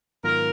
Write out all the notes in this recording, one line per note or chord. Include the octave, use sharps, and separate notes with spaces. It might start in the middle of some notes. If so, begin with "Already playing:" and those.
G#2 D#3 F#3 B3 F4 A#4